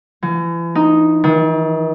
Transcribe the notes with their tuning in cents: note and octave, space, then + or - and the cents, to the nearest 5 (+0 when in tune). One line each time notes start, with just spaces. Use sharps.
E3 +40
D#4 +0
D#3 +45